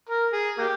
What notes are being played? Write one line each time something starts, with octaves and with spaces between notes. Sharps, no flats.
A#4
G#4
A#3 G4